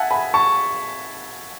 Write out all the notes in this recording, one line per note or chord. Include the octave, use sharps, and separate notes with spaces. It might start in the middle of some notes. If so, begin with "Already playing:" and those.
Already playing: E5 F#5 G#5 A5
G#5 B5
A5 C#6